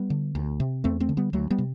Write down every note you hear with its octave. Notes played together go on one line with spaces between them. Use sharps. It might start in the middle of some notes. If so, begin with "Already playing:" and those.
Already playing: G3 B3
D3
D2
C3
E2 A3 C4
A3 C4
D3
G3 B3
D2 F#3 A3
G3 B3
C3